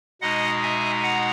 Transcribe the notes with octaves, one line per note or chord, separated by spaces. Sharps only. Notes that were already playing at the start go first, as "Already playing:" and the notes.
B2 G#3 D#4 D#5 F#5
E5 G#5
F#5 A#5